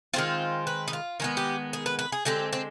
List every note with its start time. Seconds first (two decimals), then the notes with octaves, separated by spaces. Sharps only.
0.14 D#3 G#3 C4 F4
0.67 B4
0.88 D#4
0.93 F4
1.20 D#3 G#3 B3 D#4
1.37 G4
1.73 G#4
1.86 B4
1.99 B4
2.12 G#4
2.25 D3 G#3 C4 G4
2.53 C4